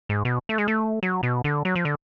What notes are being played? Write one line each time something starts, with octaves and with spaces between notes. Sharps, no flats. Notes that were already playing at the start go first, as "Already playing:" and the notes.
G#2
B2
A3
G#3
A3
F#3
B2
D3
F#3
F3
D3